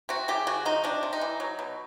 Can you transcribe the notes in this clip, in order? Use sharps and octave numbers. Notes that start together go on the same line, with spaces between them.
C3 F#4
C#3 G4
C#3 F#4
F3 D#4
C3 D4
C3
D#4
E3
F#3
B2